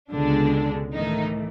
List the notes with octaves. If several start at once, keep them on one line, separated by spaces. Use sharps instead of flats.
C#2 B2 D3 G#3 D4
A2 D#3 E3 A3 D#4